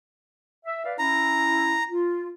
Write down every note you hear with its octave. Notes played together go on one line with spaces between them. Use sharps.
E5
B4 D5 F5
C#4 E4 A#5
F4